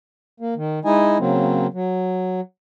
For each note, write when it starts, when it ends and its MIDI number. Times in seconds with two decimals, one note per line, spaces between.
0.40 0.54 58
0.56 0.79 51
0.85 1.18 56
0.85 1.18 63
0.85 1.18 64
0.85 1.18 75
0.85 1.18 80
1.19 1.67 49
1.19 1.67 54
1.19 1.67 58
1.19 1.67 60
1.74 2.41 54